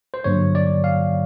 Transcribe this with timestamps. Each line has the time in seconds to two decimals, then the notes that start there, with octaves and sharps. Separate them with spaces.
0.14 C5
0.24 G2 D3 F#3 A#3 C#5
0.55 D5
0.84 F5